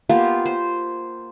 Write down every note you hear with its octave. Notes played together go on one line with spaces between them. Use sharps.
A#3 B3 F4 G4
C5